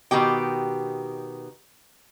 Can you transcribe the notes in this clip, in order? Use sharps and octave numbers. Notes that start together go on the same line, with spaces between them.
B2 D#3 G4 G5